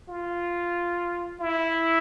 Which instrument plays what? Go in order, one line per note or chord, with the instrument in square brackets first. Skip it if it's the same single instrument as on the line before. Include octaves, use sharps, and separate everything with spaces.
[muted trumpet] F4
E4